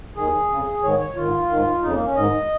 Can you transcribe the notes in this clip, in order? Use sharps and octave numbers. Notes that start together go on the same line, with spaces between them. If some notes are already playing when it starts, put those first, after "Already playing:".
D#2 D#3 G#4
F2 C#3
G#2 D#3 C#5
C#5
G#2 D#3 F4
G#2 D#3
F2 C#3 D#4
A#3
C#4
G#2 D#3 D#5